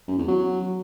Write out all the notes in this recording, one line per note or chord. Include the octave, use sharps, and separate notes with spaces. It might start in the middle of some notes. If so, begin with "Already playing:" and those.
F#2
E2
F#3